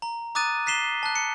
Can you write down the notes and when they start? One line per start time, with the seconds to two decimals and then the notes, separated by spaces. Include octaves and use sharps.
0.02 A#5
0.35 A#5 D6 D#6 F#6 A6 D#7
0.66 F#6 B6 C7 E7 G7
1.03 A5 F#6
1.16 C#7